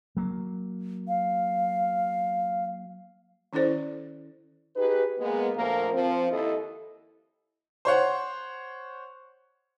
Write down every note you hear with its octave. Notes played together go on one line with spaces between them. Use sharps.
F#3 A#3
F5
D#3 C#4 E4 A4 C5 D5
D#4 G4 G#4 B4
G#3 A#3 B3
D2 A#2 F3 A3 A#3 A#4
F3 C4
D#2 E4 A4 D#5
C5 C#5 F#5